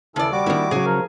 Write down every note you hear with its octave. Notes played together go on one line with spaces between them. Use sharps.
D#2 C#3 E3 A4 D5
G3 F#4 D6
D#3 A#3 C#4 D4 E4
C#3 F#3 G#4
F3 A#4